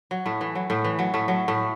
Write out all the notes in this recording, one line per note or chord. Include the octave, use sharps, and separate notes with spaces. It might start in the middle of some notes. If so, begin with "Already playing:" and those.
F#3
A2 A3
E3
F#3
A2 A3
E3
F#3
A2 A3
F#3
A2 A3